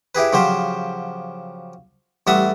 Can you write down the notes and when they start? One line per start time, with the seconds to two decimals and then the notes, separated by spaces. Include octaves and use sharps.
0.15 E4 G4 G#4 B4
0.33 C#3 F3 F#3 G4 C5
2.27 A1 G3 E5 F#5 D#6